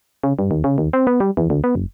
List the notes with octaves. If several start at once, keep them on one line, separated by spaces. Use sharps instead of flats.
C#3
G2
D#2
C#3
D#2
C4
B3
G3
E2
D2
B3
F#1